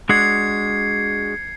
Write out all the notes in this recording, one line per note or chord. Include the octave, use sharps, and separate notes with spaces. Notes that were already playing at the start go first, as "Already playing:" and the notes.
G#3 D4 F#4 G#6 C7 C#7